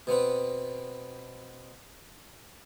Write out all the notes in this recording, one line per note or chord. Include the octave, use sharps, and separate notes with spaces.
B2 B3 C4 B4